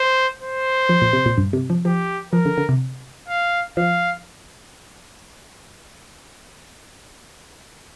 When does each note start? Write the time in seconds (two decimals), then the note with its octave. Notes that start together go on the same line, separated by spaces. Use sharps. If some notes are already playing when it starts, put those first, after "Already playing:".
Already playing: C5
0.42 C5
0.89 F3
1.02 A#2
1.13 C3
1.26 A#2
1.38 G2
1.53 C3
1.70 F3
1.85 F3 G4
2.33 F3 A#4
2.45 D3
2.58 D3
2.69 C3
3.29 F5
3.77 F3 F5